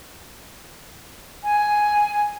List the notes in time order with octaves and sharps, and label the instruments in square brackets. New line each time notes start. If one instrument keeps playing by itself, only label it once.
[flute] G#5